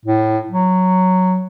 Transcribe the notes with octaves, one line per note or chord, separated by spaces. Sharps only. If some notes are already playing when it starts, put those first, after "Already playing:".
A2
F#3